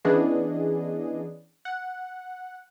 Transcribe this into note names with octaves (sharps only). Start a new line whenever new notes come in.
E3 B3 C#4 D4 G#4 D#5
F#5